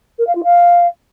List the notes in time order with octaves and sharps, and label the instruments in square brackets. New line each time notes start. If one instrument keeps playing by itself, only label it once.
[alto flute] A#4
F5
F4
F5